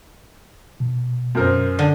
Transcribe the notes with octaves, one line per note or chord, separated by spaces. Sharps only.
B2
F#2 A#4 C5
D3